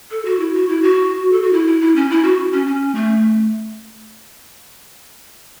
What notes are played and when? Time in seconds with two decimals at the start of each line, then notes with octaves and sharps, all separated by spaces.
0.11 A4
0.25 F#4
0.40 E4
0.55 F#4
0.69 E4
0.83 F#4
1.33 A4
1.42 F#4
1.53 E4
1.67 E4
1.81 E4
1.96 C#4
2.10 E4
2.24 F#4
2.53 C#4
2.67 C#4
2.95 A3